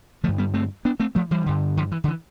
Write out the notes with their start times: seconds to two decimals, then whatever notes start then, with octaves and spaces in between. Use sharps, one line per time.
0.23 D3 F3 A3
0.28 G2
0.38 G3 B3
0.54 A3 C4
0.85 B3 D4
1.00 A3 C4
1.15 F3 A3
1.31 E3 G3
1.46 G2 D3
1.77 D3 F3
1.91 E3
2.04 D3
2.08 E3